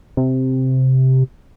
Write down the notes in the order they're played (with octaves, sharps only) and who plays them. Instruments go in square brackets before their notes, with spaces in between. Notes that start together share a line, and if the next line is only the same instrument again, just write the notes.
[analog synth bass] C3